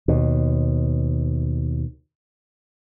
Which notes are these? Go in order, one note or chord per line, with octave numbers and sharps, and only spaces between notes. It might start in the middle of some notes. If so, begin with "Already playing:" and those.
D#2 B2